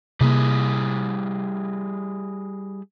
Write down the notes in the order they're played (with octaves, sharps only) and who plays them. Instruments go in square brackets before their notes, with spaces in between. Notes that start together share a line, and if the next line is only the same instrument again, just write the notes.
[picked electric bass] C3 A#3 [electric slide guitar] G3 E4 G#4